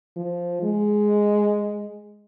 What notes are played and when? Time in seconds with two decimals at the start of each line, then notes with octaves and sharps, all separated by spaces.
0.16 F3
0.63 G#3